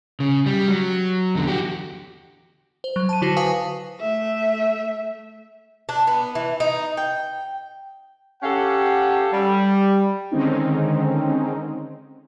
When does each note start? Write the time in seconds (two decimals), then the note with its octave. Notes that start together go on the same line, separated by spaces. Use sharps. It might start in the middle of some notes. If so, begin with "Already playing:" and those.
0.20 C#3
0.46 G3
0.68 F#3
1.35 E2 D3
1.47 F#4 G4
2.84 C5
2.96 F#3
3.09 A5 D#7
3.22 D3 E4 F#4 C5 A#6 C7
3.37 B4 F5 G#5 A5 C#6 D#6
4.00 A3 E5
5.89 D4
6.07 B3
6.35 E3
6.60 D#4
6.97 G5
8.43 C#4 G4 A4 F5 F#5
9.33 G3
10.31 D3 D#3 G#3 C4 C#4 D#4